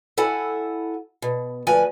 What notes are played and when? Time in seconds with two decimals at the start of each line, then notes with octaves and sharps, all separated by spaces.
0.18 E4 A4 F#5 G#5
1.22 B2
1.67 D2 F3 B4 G#5